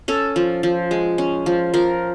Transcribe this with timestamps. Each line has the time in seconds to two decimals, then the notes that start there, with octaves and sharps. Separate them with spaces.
0.08 C#4 A4
0.36 F3
0.63 F3
0.91 G#3
1.18 C#4
1.46 F3
1.74 F3 A#4